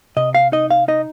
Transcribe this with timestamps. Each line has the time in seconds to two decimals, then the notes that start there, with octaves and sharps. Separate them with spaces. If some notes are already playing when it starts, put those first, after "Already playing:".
0.17 C3 D#5
0.35 F5
0.52 D#4 D#5
0.71 F5
0.88 D#4 D#5